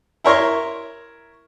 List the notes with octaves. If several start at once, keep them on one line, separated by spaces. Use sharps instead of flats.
E4 A#4 C#5 A#5 C6